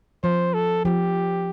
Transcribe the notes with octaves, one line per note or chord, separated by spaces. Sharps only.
F3 C5
A4
F3 G4